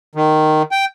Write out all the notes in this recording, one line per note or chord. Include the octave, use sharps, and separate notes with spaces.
D#3
G5